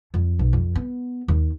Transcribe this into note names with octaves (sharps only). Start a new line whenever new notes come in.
F2
B1
F2
B3
D#2